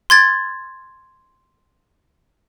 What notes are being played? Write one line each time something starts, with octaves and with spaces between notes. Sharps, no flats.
C6 G#6 A6